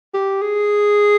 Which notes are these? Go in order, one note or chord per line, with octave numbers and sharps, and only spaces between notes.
G4
G#4